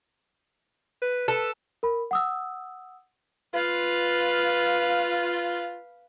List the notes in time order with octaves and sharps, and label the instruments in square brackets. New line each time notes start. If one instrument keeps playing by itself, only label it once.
[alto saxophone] B4
[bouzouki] A4 [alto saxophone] B4
[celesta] A#4 B5
F#5 D#6 E6
[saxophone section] F4 [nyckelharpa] B4 F5